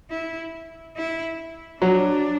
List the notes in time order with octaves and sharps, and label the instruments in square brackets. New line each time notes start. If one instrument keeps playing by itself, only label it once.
[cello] E4
E4
[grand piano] F#3 [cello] D4